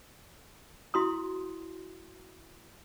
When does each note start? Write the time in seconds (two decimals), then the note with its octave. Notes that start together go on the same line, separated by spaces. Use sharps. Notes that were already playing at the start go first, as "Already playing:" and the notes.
0.94 E4 F#4 C6 D#6